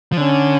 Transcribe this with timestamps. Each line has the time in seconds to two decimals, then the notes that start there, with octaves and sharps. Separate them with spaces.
0.12 F3
0.17 D3 C#4